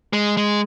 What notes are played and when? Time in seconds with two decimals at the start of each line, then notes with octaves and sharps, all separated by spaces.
0.13 G#3
0.37 G#3